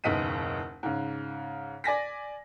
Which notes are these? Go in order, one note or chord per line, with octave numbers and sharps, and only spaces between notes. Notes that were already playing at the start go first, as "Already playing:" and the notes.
F#1 D#2 B2 D#5 B6 D#7
G#2 C#3
D5 G#5 A#6 B6